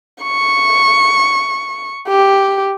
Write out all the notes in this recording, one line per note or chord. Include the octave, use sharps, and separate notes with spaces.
C#6
G4